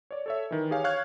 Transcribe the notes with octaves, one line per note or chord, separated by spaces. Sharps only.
C#5 D5
A4 C#5 E5
D#3 E3
G4 G#4 C#5 F5 G#5
C#5 F5 C#6 F6 F#6 G#6